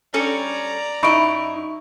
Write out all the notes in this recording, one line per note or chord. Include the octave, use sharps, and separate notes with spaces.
G3 C#4 A4 D5 A#5
F#2 D#4 E4 D#5 B5 C#6 D7